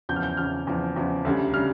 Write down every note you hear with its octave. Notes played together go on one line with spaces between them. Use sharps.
E2 C#3 F3 G6
F6
G6
E2 C#3 F3 F6
E2 C#3 F3
E2 C#3 F3
D2 C#3 G3
C#3 G3 F6